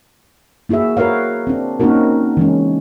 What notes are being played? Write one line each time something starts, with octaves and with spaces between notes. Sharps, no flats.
A#3 E4 F#4 G#4 E5
F#4 A#4 B4 C#5 F5
C4 D4
A#3 C4 C#4 D#4 F#4 A#4
E3 G#3 C#4